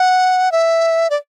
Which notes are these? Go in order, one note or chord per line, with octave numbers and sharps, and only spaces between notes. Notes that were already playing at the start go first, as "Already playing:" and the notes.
Already playing: F#5
E5
D5